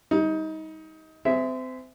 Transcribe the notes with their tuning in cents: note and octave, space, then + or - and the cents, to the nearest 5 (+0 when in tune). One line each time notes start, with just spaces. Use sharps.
G3 +10 D#4 +25
C4 -30 G#4 +0 E5 +0